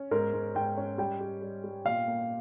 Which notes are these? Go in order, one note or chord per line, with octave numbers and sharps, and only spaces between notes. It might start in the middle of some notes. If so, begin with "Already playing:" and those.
Already playing: C#4
G#2 A#4
G#2
G#2 G5
C#4
G3 G5
G4
G3
G3
A#2 F5
A#3